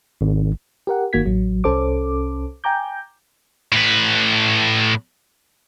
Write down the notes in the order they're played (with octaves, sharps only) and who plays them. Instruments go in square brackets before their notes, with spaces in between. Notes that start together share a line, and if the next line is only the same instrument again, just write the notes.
[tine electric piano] G#1
[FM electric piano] G4 A#4 F#5
G1 D#3 A#3 F#4 G#6 B6
A1 F#3
C2 C#4 A4 C5 D6
G5 G#5 A#5 D6 G6
[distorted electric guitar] A2 B4